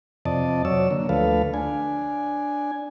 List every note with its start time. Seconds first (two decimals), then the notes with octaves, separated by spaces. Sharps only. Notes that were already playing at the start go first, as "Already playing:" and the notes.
0.25 F2 C3 D5 D#5 A5
0.65 F#3 C#5 D5 E6
0.91 D3 A#3
1.09 D2 F3 A3 A4 B4 F5
1.54 D4 G#5